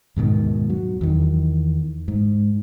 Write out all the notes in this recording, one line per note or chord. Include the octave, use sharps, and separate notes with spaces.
D#2 G#2 B2 D#3
F#3
E2 D#3
G#2